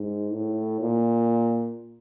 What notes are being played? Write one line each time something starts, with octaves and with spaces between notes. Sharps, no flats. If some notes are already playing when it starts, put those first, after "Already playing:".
Already playing: G#2
A2
A#2